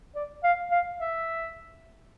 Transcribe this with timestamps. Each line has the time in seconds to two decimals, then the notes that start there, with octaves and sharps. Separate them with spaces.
0.15 D5
0.44 F5
0.71 F5
1.00 E5